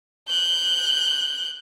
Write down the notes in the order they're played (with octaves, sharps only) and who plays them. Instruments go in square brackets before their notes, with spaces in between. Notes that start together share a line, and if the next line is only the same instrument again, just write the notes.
[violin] F#6 G6